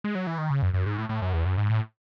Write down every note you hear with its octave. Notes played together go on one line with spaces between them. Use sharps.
G#3
F#3
E3
D#3
C#3
F#2
F#2
G#2
A2
A2
F#2
E2
F#2
G#2
A2